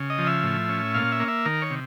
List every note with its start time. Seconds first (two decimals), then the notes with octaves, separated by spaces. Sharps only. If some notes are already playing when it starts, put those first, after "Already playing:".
Already playing: C#3
0.10 D#5
0.18 F3
0.27 E5
0.44 A2
0.69 C#4
0.94 A#2 F5
1.12 E5
1.20 A#3
1.28 E5
1.46 D#3 A#4
1.62 C#5
1.71 C3